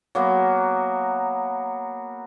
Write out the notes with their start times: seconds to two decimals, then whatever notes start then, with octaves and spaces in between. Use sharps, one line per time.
0.15 F#3 A#3 B3